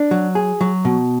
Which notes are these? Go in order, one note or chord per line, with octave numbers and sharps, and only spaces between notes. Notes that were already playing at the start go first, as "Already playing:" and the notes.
Already playing: D4
F#3
G#4
F#3
B2